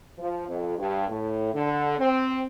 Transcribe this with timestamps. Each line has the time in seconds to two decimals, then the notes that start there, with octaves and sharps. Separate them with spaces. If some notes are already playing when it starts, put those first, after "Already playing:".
0.19 F3
0.49 F2
0.78 G2
1.08 A2
1.54 D3
1.98 C4